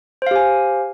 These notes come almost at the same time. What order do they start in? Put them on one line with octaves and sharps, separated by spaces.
C5 F5 G4 G#5